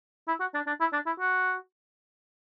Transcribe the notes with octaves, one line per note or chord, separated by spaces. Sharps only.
E4
F#4
D4
D4
E4
D4
E4
F#4